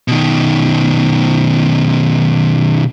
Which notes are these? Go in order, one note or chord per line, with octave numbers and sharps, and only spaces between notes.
B2 D#3